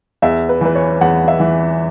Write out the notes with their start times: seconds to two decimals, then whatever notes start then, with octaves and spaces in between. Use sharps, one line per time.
0.22 E2 E5
0.49 B4
0.61 E3 B4
0.75 C#5
1.01 E2 F#5
1.28 E5
1.40 E3